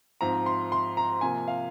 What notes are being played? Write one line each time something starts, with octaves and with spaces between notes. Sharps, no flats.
G#2 F3 C4 A#5
C6
C6
A#5
C3 F3 A#3 G#5
F5